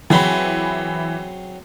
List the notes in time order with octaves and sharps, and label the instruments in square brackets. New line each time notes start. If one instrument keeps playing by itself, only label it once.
[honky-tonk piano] E3 B5 [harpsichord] F#3 C4 G#4